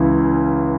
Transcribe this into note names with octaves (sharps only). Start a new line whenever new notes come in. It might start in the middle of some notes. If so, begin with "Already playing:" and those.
Already playing: C#2 C#3 E3